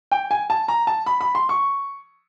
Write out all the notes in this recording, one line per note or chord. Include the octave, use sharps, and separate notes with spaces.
G5
G#5
A5
A#5
A5
B5
B5
C6
C#6